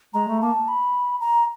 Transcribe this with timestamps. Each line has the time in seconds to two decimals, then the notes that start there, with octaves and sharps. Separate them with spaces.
0.14 G#3 A#5
0.28 A3
0.42 A#3 A5
0.68 B5
1.21 A#5